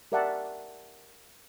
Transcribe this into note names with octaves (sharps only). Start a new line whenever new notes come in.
G4 A#4 D5 E5 F#5 A5